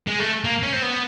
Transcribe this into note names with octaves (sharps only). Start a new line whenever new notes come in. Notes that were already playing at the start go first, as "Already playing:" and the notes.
G#3
A3
A#3
C#4
C4
B3